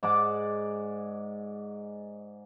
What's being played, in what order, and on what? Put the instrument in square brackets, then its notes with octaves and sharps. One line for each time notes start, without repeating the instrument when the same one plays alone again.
[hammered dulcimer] G#2 D5 F#5 D6